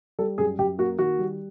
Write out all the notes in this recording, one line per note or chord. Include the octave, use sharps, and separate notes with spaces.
G3 A4
F#2 G#4
F#2 G4
A#3 F#4
D#3 F#4
G3